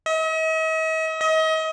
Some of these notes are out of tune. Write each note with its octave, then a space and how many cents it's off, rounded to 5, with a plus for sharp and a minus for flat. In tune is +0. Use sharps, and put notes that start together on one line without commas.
D#5 +45
D#5 +35